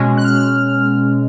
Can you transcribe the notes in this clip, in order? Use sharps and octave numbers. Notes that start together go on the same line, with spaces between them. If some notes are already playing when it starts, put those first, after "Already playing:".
Already playing: B2 G#3 C#4
F#6
F6